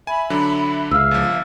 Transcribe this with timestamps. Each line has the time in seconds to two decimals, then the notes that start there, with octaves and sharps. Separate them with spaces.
0.07 E5 G#5 B5
0.30 D3 F#3 D4
0.91 C#2 E5 F5 E6 F6
1.11 G1 F3